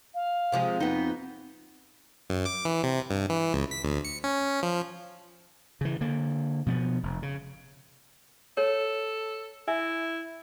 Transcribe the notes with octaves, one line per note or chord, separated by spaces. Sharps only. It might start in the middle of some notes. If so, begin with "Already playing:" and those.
F5
C3 F3 G#3
F2 B3 D#4
F#2
D6
E3
C3
G2
E3
C#2
B6
D2
C#7
C#4
F3
C#3 E3
D3 A#3
B2 F3 A3 B3
F1
C#3
A4 C#5
E4 E5 G#5